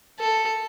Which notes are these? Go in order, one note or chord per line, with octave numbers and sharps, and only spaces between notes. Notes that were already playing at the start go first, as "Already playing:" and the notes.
A4